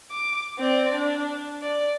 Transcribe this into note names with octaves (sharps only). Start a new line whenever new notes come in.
D6
C4 D5
D4
D5